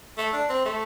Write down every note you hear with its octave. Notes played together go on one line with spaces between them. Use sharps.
A3
D4
C4
A3